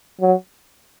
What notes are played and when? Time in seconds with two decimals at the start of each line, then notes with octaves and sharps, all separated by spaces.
0.21 F#3